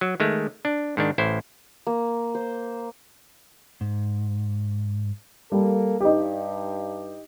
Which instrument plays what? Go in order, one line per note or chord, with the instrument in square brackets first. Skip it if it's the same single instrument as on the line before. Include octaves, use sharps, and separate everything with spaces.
[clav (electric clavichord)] F#3
D#3 G#3 A3
D4
G#2 D#3 D4
A1 E4 C5
[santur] A#3
C5
[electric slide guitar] G#2
[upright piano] G3 [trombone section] A#3 A4
[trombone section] G2 [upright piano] D#4 G4